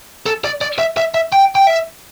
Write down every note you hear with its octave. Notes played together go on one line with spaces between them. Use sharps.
A4
D5
D5
E5
E5
E5
G5
G5
E5